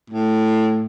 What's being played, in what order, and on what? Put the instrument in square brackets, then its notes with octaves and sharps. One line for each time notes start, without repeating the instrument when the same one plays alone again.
[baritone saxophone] A2